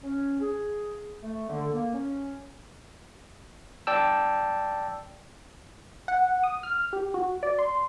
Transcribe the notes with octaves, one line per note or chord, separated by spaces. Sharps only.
C#4
G#4
A3
D3
A#3
C#4
D5 G5 A5 E6
F#5
D#6
F6
G4
F#4
D5
C6